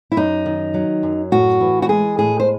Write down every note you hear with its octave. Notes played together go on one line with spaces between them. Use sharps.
E4
F#2 D#4
D#3
F#3
F#2
A2 F#4
E3
F#4
G#3 G#4
A2 G#4
C5